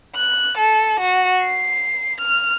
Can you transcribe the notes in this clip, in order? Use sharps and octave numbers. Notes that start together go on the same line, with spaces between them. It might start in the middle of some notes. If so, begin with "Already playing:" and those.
F#6
A4
F#4
C7
F6